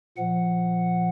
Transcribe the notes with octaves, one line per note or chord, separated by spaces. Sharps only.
A#2 F3 F#5